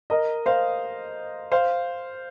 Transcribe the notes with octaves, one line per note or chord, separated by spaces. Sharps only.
A#4 D#5
C5 F5
C5 F5